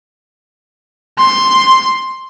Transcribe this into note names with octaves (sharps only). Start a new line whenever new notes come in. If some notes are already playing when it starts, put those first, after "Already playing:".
C6